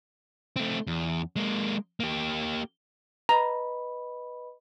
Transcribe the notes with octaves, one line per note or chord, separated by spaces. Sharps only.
A3 C4
E2
G#3 A#3
A#3 G4
B4 D#5 A#5 B5